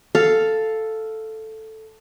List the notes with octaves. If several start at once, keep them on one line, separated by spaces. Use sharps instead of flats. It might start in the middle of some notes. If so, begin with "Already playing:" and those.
A4 F5